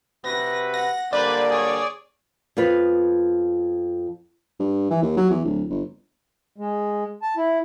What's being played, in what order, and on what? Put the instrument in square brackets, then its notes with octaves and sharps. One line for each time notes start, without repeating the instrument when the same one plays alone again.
[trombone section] C3 F#4 B4 [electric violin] A#6
[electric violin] F#5 [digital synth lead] A#6
[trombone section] D3 G3 A#3 [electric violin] B4 C5 [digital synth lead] D5
[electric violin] G#4 C#5
[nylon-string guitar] F2 B3 F4 B4
[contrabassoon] G2
E3
D#2
F#3
E2
D1
G1
[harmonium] G#3
A5
E4